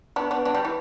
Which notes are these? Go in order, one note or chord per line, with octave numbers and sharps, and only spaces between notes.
B3 D4
B3 D4
B3 D4
G3
E3